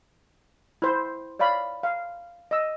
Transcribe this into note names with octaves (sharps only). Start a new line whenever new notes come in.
E4 C5
C#5 D5 F5 B5
F5
D#5 E6